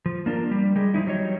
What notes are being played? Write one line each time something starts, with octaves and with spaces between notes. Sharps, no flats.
F3
A#3 D4 F4 A#4
G3
G3 G#3
F3 F#3 D#4 E4
F#3 G3 D#4 C#5